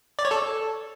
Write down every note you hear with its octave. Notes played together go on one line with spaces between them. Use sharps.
D5
C#5
A4